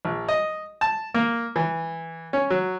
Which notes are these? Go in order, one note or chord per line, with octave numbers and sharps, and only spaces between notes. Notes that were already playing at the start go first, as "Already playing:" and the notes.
A#1
D#5
A5
A#3
E3
C#4
F#3